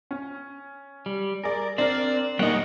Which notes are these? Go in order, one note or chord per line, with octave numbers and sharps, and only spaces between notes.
C#4
G3
G#4 A#4 D5
C4 D4 A#4 C5 D5
G3 A#3 D#4 C#5 D#5 F#5 G5